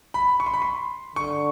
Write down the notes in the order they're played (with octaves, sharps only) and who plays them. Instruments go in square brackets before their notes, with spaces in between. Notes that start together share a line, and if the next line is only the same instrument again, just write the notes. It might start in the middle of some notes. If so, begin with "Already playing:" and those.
[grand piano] B5
C#6
C6
B5
C6
[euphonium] D3 [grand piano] C#6